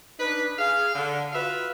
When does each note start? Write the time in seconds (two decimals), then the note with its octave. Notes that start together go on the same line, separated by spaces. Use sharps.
0.20 D4 D#4 B4
0.58 G#4 F5
0.95 D3
1.33 F4 F#4 B4 E5 F5